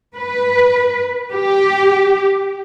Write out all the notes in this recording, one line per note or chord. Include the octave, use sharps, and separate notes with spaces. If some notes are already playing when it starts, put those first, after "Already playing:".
B4
G4